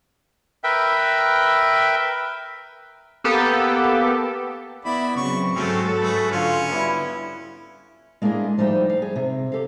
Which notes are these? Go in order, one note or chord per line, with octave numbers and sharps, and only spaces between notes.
A#4 B4 E5 G5
A#3 B3 G4 A4
B3 E4 D5 B5
C#3 F#3 C4 C#6
G#2 F#3 A3 C4 C#4 F#4 A4
A3 G#4 B4
D3 C#4 F4
G3 B3 E4
G#3 A#3 D4 E4 G#4 D#5
F3 G3 A3 D#4 C5 G5
F5
G#4
C3
G4 A4 D#5 F5